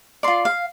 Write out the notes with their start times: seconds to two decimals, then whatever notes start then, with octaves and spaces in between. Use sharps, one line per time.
0.23 F4 D5 C6
0.45 F5